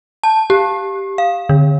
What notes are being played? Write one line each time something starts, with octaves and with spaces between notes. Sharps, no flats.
A5
G4
F5
D3